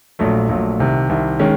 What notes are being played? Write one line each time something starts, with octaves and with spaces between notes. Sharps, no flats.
A#1 A#2 F#3 A3
A#1 A#2 F#3 A3
C2 C3 D#3
C2 C3 D#3
D#3 G#3 C#4